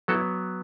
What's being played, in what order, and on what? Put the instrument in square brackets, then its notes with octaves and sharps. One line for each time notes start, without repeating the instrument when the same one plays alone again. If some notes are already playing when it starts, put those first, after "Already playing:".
[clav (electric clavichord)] F#3 B3 E4 F#4 A4